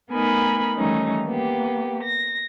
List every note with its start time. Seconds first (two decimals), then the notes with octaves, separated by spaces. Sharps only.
0.10 A3 B3 D#4 A#4 G#5 B5
0.76 D#3 E3 G3 A3 C#4 D#4
1.25 A#3 B3 G4
2.03 A#6